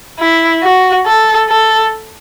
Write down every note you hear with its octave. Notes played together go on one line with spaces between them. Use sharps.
E4
F#4
A4
A4